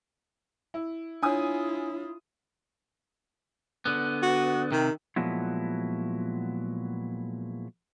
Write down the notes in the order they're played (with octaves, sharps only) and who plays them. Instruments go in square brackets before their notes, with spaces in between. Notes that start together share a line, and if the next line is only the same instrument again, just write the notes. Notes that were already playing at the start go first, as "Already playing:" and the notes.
[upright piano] E4
[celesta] D4 C#5 [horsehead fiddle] E4 F4 [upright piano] G#5 D#6
[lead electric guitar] D3 B3
[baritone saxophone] F#4
[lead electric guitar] C3 [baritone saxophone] D#3
[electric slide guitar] A#2 F3 F#3 G#3 B3 E4